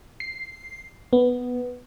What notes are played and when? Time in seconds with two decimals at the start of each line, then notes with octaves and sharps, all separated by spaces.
0.20 C7
1.13 B3